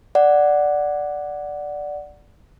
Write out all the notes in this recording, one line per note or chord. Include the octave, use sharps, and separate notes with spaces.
D5 F#5